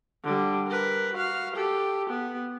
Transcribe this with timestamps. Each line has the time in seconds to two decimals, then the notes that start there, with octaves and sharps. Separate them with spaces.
0.24 D3 G3
0.68 A#4 B4
1.14 F#4 F5
1.54 G4 A4
2.10 B3